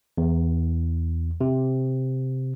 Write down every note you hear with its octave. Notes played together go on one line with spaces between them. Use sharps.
E2
C3